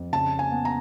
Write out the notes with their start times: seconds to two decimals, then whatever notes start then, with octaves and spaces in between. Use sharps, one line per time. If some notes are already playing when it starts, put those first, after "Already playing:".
Already playing: F2
0.13 C#3 A5
0.39 G#5
0.52 B3
0.65 A#5